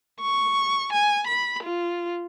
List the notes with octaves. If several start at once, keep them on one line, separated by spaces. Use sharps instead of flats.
C#6
G#5
B5
F4